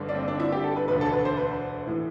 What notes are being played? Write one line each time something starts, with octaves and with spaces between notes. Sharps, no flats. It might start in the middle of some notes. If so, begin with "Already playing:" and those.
Already playing: G1 G2 D3
D4
C4
D4
E4
G4
A4
B4
E1 D2 D3 B4
A4
B4
C5
B4
A2 E3